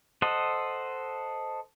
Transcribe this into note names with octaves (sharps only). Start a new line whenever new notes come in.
A4 C5 D#5 F#5